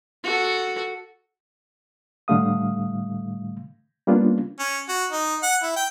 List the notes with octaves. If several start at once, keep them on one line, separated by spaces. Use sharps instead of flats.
F#4 A4
A2 D3 G3 A3 F5 D#6
G3 A#3 B3 C#4 D4 F4
C#4
F#4
D#4
F#5
E4
G5